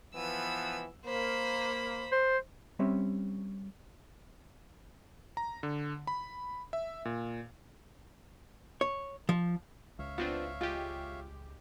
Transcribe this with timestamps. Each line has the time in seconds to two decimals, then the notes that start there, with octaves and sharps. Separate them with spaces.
0.15 E3 F3 B3 E6 D#7
1.06 A#3 C5 B5
2.12 C5
2.79 G3 C4 C#4 C#5 E5
5.37 A#5
5.63 D3
6.07 B5
6.73 E5
7.05 A#2
8.81 C#5
9.29 F3
9.99 C#2 C#5 E5 F5
10.18 B3 C4 D4 F4
10.61 G#3 F4 G4